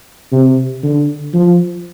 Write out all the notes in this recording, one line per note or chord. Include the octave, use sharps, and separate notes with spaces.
C3
D3
F3